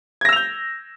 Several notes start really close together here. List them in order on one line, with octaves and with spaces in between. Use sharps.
G#6 A#6 E6 F7 G6